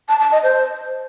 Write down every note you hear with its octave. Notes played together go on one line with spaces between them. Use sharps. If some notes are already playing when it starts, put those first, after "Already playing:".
A5
A5
D#5
C5